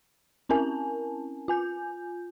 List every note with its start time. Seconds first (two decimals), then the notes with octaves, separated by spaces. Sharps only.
0.49 C4 C#4 E4 A#4 G#5 A5
1.48 F4 G#5 G6